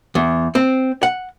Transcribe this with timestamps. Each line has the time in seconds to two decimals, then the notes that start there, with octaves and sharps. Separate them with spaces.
0.15 E2
0.55 C4
1.03 F#5